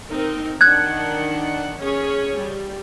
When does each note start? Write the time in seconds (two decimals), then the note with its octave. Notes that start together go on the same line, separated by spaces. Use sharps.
0.11 C4 D#4 A#4
0.61 D#3 D4 F#5 F#6 G#6
1.79 C#4 G#4 C#5
2.37 G3